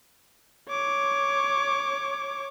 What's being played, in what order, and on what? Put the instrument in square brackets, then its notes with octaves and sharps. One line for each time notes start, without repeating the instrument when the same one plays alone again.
[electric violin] C#5 D6